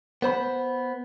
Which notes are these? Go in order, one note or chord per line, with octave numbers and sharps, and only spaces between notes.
B3 C5 B5